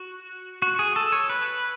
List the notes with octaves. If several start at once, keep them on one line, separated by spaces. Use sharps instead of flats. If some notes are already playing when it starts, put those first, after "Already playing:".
Already playing: F#4
F#4
G#4
A4
C#5
B4